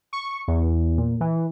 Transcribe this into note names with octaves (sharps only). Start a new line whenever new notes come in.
C#6
E2
A#2
E3